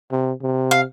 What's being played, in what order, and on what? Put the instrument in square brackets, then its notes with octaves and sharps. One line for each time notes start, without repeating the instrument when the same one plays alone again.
[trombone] C3
C3
[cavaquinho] F5